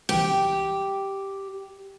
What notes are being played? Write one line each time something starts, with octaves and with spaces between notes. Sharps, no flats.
C2 E3 G4 G5